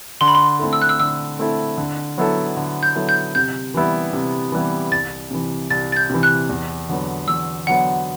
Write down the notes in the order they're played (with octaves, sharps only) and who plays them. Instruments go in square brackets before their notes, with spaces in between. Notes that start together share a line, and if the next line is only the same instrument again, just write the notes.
[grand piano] D3 [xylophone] C6
[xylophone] B5
C6
[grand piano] A3 C4 E4 A4
[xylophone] E6
F#6
E6
[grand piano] D3 [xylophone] E6
[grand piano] A3 C4 E4 A4
D3
F#3 B3 E4 A4
D3
[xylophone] G6
[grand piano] F#3 B3 E4 A4
[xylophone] G6
[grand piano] C3 [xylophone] G6
[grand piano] E3 G3 B3 E4
C3
E3 G3 B3 E4
[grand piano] C2 [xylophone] A6
[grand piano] C3 E3
[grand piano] C2 [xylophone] A6
[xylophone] A6
G6
[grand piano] C3 E3
[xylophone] F#6
[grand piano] E2
D3 F#3 B3
[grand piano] E2 [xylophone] E6
[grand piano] D3 F#3 B3 [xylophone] F#5